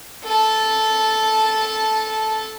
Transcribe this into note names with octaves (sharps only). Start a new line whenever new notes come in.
A4 A5